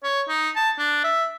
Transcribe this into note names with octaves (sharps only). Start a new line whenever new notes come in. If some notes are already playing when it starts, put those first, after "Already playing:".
C#5
D#4
A5
D4
E5